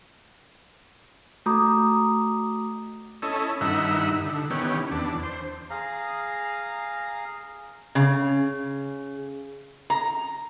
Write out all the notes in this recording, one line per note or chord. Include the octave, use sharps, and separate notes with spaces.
A3 F#4 A#5 D6 D#6
C#4 E4 A4 D#5
G2 D#3 D#4 E4 E5 F#5
D3
D#3 E3 B3 C#4 G4
E2 D4
C5
G#4 F5 A#5
C#3
A#5